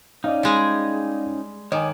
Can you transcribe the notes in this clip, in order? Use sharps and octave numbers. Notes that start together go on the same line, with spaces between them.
C#4 D#4 D5 D#5 F5
G3 G#3 G#4
D#3 C#5 D#5 G#5 D6